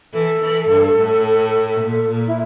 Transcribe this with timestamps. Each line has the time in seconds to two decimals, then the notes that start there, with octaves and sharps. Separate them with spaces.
0.13 E3 A4
0.41 E3
0.69 G2
0.97 A2
1.81 A#2
2.10 A#2
2.27 E4